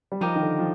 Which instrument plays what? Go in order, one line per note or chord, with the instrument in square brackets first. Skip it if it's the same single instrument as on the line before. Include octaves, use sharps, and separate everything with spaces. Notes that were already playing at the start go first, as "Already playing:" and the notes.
[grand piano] G3
[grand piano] F3 [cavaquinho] D#4 G4 A#4 D#5
[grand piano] D#3
D3
F3